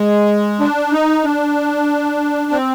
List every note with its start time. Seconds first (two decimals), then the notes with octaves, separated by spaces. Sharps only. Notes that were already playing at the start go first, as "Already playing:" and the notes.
Already playing: G#3
0.60 D4
0.92 D#4
1.24 D4
2.51 C4